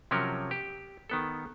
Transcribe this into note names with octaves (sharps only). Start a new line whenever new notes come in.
C3 F3 F#3 C#4 A#4
G4
D#3 B3 A4